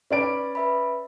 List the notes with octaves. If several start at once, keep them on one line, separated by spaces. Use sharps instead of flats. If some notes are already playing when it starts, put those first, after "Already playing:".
C#4 B4 D5 B5 D7
B4 E5 B5